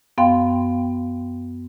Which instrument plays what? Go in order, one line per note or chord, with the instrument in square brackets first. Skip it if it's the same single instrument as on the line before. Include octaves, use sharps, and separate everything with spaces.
[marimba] F#2 B3 F5 G5 C6